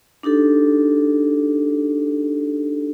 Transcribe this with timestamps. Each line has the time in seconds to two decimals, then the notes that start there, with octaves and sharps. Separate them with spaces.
0.23 D4 D#4 G4 A4